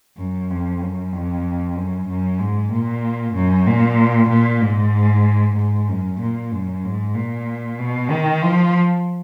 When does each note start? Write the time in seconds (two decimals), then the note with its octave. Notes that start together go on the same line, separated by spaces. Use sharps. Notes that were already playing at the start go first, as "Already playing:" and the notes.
0.17 F#2
0.50 F2
0.81 F#2
1.12 F2
1.76 F#2
2.08 F#2
2.39 G#2
2.71 A#2
3.34 F#2
3.66 A#2
4.29 A#2
4.62 G#2
5.56 G#2
5.88 F#2
6.20 A#2
6.52 F#2
6.84 G#2
7.15 A#2
7.79 B2
8.10 D#3
8.42 F3